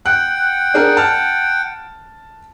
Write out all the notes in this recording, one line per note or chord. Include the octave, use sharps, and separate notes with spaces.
F#5 G5 F#6
D4 G#4 A#4
A5 F6